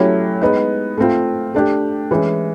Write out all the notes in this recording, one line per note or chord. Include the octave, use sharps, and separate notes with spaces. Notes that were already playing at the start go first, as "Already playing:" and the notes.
Already playing: F#3 A3 C#4 E4 G4
G#3 B3 D#4
A3 C4 F4
A3 D4 G4
E3 G#3 C#4